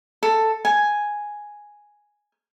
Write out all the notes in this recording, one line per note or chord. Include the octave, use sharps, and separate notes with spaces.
A4
G#5